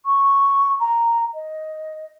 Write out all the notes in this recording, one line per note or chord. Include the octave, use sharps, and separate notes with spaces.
C#6
A#5
D#5